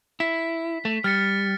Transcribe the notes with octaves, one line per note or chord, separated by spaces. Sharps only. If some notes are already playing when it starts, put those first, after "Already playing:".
E4 B6
A3
G3 F6 A6 C#7